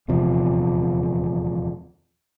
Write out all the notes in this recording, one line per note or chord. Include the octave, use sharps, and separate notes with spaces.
D#1 E2 C3 F3